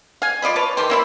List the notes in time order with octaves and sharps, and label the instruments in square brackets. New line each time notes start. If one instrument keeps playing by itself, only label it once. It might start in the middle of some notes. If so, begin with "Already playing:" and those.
[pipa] F5 G#5
F4 D5 D#5 B5
B4 C#5 A5
D#3 E3 G4 C6
A#3 E4 C#5 B5